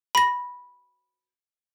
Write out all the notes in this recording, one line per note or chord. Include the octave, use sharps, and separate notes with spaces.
B5 A#6